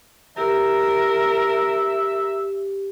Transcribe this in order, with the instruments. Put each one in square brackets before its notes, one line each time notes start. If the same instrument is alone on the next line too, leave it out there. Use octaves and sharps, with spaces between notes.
[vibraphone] G4 [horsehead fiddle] A#4 [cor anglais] E5